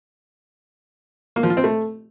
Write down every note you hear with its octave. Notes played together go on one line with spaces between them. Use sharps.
A#3
F3
F4
C4
A3